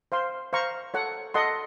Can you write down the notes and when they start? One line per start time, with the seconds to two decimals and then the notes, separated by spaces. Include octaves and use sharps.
0.12 C5 F5 C6
0.53 C5 F5 A#5 C#6
0.94 A4 C#5 F#5
1.34 A4 D#5 F#5 C6